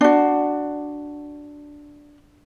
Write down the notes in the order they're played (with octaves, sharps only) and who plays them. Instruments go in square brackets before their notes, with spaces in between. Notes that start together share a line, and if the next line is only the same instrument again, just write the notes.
[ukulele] D4 F#4